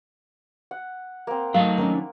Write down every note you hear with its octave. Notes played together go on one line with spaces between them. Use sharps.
F#5
A#3 C4
F#3 A3 D#4 F5
D#3 C#4 D4